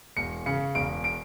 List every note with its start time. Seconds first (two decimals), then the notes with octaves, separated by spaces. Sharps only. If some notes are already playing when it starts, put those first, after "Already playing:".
0.17 E1 C#7
0.46 C#3 C#7
0.75 E1 D7
1.04 D7